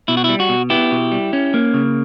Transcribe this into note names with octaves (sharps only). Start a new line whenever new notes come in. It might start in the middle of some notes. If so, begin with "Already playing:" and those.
B2 E4
F#4
G3 E4
F#4
B2
B3 E4 G4
B2
G3
C#4
A#3
C#3